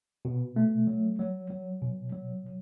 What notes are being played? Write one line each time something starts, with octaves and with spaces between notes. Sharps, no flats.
B2
A3
F#3
F#3
F#3
B2
F#3